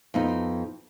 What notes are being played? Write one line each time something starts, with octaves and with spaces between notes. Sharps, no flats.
F2 B3 D#4